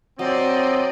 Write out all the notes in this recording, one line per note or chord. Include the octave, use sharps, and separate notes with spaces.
F#3 C4 D5 D#5